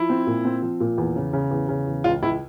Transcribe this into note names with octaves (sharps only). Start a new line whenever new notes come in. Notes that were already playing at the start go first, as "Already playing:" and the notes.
Already playing: F3 E4
C4
A#2
C4
F3
A#2
E2
C#3
C#3
E2
C#3
E2
C#2 F4
C#2 E4